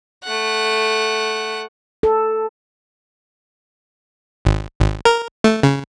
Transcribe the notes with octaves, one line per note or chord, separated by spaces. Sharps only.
A3 F#5
A4
G#1
G#1
A#4
A3
C#3